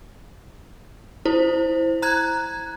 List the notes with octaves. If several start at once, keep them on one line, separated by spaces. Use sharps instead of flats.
E4 C5
A#5 F#6 G#6